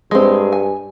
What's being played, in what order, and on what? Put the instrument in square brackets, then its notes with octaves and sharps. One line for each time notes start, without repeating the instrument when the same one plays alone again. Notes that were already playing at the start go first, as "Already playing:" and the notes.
[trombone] G2 [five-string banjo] G#3 C4
[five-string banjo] G#5